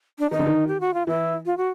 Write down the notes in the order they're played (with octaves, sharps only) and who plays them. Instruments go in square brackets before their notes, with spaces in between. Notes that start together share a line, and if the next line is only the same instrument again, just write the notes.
[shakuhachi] D4
[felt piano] D#3 [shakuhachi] D#4
[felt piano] D3
D#3
[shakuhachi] G4
F#4
F4
[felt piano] E3 [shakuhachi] E4
[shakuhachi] F4
F#4